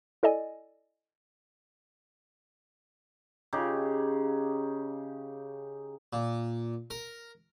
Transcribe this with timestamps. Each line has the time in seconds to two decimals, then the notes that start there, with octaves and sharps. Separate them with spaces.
0.23 E4 A4 D5 D#5 G#5
3.53 C#3 D#4 G4
6.13 A#2
6.90 A#4